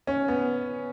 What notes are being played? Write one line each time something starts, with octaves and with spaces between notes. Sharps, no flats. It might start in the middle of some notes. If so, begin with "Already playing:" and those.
C#4
B3